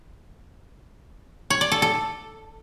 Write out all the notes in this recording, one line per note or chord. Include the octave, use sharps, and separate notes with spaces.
C#5
D5
A4
A4